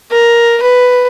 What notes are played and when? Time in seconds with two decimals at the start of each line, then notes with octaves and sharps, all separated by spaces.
0.12 A#4
0.62 B4